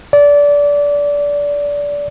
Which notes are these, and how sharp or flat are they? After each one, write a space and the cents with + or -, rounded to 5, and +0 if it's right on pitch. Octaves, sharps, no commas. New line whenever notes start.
D5 -20